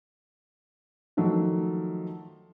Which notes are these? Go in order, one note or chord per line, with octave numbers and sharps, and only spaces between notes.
D#3 F3 F#3 A3